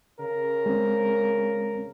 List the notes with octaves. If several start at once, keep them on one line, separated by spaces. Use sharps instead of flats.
C#3 A#4
G#3 C4